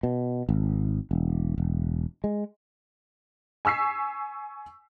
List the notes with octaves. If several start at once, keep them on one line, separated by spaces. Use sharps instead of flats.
B2
G#1
E1
E1
G#3
G#5 C#6 E6 B6 C7